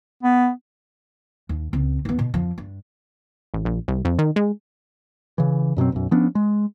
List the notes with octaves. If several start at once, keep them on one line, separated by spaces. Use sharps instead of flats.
B3
D#2
C#2 C4
D#2 B3
B2
F2 F3
G2
A1
A#1
C2
F2
D#3
G#3
C#3 E3
F#2 B2 F#3 C4
B1 F#2
F3 B3 C#4 D4
G#3